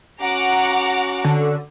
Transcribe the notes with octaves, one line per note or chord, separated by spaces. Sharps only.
C#4 F#4 F#5 A#5 D6
D3